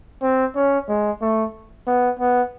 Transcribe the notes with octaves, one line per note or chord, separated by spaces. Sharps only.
C4
C#4
G#3
A3
B3
B3